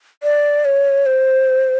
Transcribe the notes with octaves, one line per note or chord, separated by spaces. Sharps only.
D5
C#5
C5